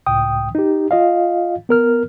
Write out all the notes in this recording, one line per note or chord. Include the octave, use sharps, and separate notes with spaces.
C#2 A2 G5 D#6
D#4 G4
F4 D#5 F5
B3 A#4 F6